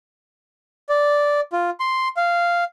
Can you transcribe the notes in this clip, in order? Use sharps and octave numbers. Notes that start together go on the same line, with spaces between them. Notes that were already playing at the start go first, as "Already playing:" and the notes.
D5
F4
C6
F5